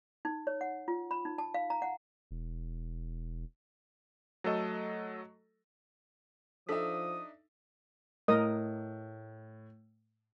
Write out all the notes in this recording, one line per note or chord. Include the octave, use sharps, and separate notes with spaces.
D#4
C#5
F#5
F4
B5
D#4
A5
F5
A#5
F#5
E1
F#3 A3 A4 D#5
F3 D4 D#4 A4 E5 D#6 B6
A2 A#4 D#5 D#6